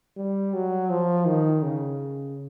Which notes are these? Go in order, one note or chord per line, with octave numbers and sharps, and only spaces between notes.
G3
F#3
F3
D#3
C#3